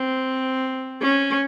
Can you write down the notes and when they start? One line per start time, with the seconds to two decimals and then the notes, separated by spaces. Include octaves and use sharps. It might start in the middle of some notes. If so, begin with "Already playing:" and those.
Already playing: C4
1.02 C#4